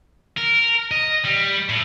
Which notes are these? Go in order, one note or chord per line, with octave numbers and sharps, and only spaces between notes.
A#4
D#5
G3
A2